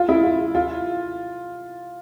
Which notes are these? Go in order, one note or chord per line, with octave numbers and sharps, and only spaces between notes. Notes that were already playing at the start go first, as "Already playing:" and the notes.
Already playing: F4
E4
F4
F4